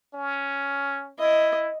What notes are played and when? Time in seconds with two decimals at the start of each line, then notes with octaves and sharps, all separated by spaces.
0.14 C#4
1.18 E4 D#5